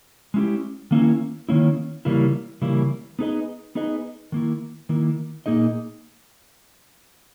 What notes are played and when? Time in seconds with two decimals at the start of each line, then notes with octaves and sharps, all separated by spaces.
0.34 G#3 C#4 E4 G4
0.91 D#3 A#3 C#4 E4
1.49 D#3 A#3 C#4 E4
2.05 C#3 E3 G3 A#3 E4
2.62 C#3 E3 G3 A#3 E4
3.19 B3 D#4 G#4 B4 D#5
3.75 B3 D#4 G#4 B4 D#5
4.32 D#3 A#3 E4
4.89 D#3 A#3 E4
5.46 A#2 A#3 D#4 G#4 D#5